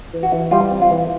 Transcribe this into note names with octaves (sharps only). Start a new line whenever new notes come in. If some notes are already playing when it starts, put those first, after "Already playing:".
E3
F#4
E3
G3 F4
C4
F4
E3